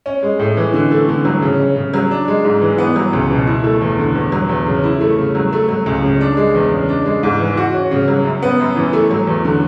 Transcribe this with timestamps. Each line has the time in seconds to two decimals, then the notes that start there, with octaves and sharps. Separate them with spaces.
0.06 C#4
0.22 G#3
0.39 A2
0.57 E3
0.74 D3
0.91 A3
1.08 D3
1.25 F#3
1.42 C#3
1.59 C#4
1.76 C#3
1.94 F#3
2.11 D4
2.28 G#3
2.45 G#2
2.62 E3
2.78 B3
2.96 F#3
3.13 C#2
3.31 B2
3.47 E4
3.64 A3
3.81 E2
3.99 D3
4.15 E2
4.32 F#3
4.49 E2
4.67 C#3
4.84 E4
5.01 A3
5.18 C#3
5.35 F#3
5.53 A3
5.69 F#3
5.86 C#2
6.03 C#3
6.21 D4
6.37 G#3
6.55 E2
6.71 C#3
6.89 D4
7.06 G#3
7.23 G#2
7.40 E3
7.57 F#4
7.74 C#4
7.91 C#3
8.08 F#3
8.25 F#2
8.42 B3
8.60 F#2
8.76 E3
8.93 A3
9.11 F#3
9.27 E2
9.45 D3